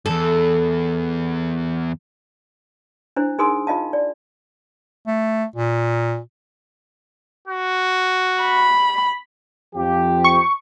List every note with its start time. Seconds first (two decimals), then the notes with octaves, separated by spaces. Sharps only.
0.06 E2 G2 A4
3.16 D4 E4 C5
3.39 D#4 G#4 A#4 G#5 C6 D#6
3.67 F4 D#5 F5 A5
3.93 D5
5.07 A3
5.56 A#2
7.48 F#4
8.42 B5
9.75 F2 F3 G4
10.24 C#6